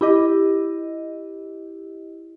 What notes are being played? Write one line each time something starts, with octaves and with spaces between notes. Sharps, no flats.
E4 G4 D#5